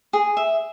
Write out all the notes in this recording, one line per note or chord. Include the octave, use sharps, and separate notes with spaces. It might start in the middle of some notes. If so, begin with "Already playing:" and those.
G#4
E5